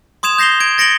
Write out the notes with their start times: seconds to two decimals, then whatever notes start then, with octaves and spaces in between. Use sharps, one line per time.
0.23 C6 D#6 G#6 E7 F7
0.38 G6 A#6 C7 F7 G7
0.60 G#6 D7
0.78 A6 A#6 C#7 D7 F#7 G7